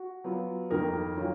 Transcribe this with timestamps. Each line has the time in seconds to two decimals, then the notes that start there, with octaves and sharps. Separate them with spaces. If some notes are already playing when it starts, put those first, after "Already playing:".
Already playing: F#4
0.24 F#3 B3 F4
0.70 F2 D#3 A#3 A#4
1.17 D#3 F#3 C#4 F4